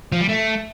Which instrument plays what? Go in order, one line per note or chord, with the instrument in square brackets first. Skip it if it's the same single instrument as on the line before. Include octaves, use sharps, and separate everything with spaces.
[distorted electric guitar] F3
G3
A3